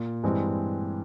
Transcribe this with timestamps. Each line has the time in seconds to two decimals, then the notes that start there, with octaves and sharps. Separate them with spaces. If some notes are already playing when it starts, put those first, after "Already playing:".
Already playing: A#2
0.23 G2 E3 G#3 C4